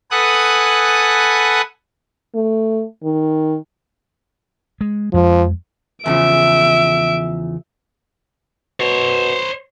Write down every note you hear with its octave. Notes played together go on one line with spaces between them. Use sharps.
A4 B4 F#5 G#5 D#6 F#6
A3
D#3
G#3
F2 F3 G#3
E2 C#3 F3 E5 D7
B2 C5 C#5